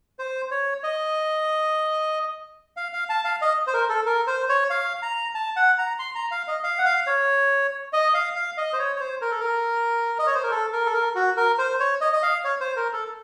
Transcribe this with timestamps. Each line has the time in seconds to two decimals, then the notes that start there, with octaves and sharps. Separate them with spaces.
0.19 C5
0.51 C#5
0.83 D#5
2.77 F5
2.93 F5
3.09 A5
3.25 F5
3.42 D#5
3.67 C5
3.74 A#4
3.89 A4
4.06 A#4
4.27 C5
4.49 C#5
4.70 F5
5.02 A#5
5.35 A5
5.56 F#5
5.78 A#5
5.99 C6
6.15 A#5
6.31 F5
6.48 D#5
6.63 F5
6.78 F#5
6.85 F5
7.07 C#5
7.93 D#5
8.14 F5
8.36 F5
8.57 D#5
8.73 C5
8.79 C#5
8.96 C#5
9.00 C5
9.22 A#4
9.31 A4
9.40 A#4
10.19 D#5
10.27 C#5
10.35 C5
10.43 A#4
10.51 A4
10.73 A#4
10.86 A4
10.94 A#4
11.15 F#4
11.37 A#4
11.58 C5
11.80 C#5
12.01 D#5
12.13 D#5
12.23 F5
12.44 C#5
12.60 C5
12.76 A#4
12.93 A4